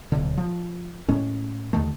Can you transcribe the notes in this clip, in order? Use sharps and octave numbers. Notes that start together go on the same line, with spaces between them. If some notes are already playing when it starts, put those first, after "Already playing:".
D1 B1 D3
F3
A2 G#3 C#4
D#2 D3 D#3 A3